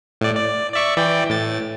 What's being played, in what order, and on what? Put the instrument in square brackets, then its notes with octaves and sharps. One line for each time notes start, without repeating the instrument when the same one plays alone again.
[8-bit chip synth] A2 D5
D5
D5 E5 C#6
E3 D5 G5
A2 A6